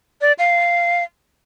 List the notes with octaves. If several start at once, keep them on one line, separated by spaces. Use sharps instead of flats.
D5
F5